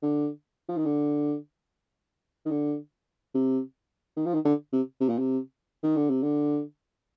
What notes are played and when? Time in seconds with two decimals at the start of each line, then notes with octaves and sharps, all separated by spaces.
0.03 D3
0.69 F3
0.77 D#3
0.85 D3
2.46 D#3
2.51 D3
3.35 C3
4.17 D#3
4.26 F3
4.34 D#3
4.45 D3
4.73 C3
5.01 C3
5.09 A#2
5.19 C3
5.83 D#3
5.96 D3
6.10 C3
6.23 D3